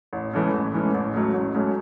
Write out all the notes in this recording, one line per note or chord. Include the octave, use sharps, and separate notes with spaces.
A1
G#2 E3 A3 C#4
A1
G#2 E3 A3 C#4
A1
G#2 F#3 A3 C#4
A1
G#2 F#3 A3 C#4